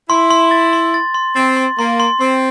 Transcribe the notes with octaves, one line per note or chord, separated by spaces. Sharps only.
E4 C6
C6
A6
C6
A6
C6
C4 A6
C6
A#3 C6
C6
C4 C6